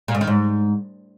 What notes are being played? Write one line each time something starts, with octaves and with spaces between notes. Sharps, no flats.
A#2
G#2
D#3
G#2